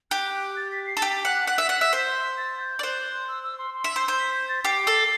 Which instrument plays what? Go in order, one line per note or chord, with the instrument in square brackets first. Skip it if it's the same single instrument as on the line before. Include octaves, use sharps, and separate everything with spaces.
[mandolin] G4 [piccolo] F#6
[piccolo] F#6
A6
B6
C7
[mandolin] A4
[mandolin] G4 [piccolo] B6
[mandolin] F#5
F#5
E5
F#5
E5
C5
[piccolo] A6
G6
[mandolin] D5
[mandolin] C5 [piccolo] F#6
[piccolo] E6
E6
C6
C6
[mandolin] E5
[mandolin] C5 [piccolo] E6
[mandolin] C5
[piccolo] B6
G6
A6
[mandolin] G4 [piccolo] C7
[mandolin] A4